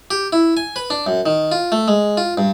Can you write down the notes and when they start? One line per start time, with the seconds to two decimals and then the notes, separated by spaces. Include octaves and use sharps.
0.11 G4
0.33 E4
0.57 G#5
0.76 B4
0.90 D4
1.07 F#2
1.26 D#3
1.52 F4
1.72 A3
1.88 G#3
2.17 F4
2.38 G2